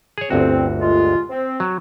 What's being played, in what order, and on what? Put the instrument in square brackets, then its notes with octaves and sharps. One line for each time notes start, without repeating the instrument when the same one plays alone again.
[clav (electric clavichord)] G#4 C#5
[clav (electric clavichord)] G1 D2 F#4 [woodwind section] C4
[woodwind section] G#3 F4
C4
[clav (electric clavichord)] F#3